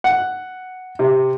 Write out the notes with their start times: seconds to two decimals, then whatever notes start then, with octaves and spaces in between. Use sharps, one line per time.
0.04 F#5
0.99 C3